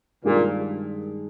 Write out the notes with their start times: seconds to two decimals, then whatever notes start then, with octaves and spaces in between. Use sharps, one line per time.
0.24 G2 A#2 D#3 G#3 D4 G#4